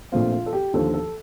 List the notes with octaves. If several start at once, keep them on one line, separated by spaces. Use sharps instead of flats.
A#1 A#2 A3 C4 F4
F4
A4
G4
D#2 D3 F3 A4
A4